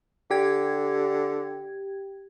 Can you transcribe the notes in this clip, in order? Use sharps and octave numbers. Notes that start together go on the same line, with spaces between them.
D3 G4 G5 G#6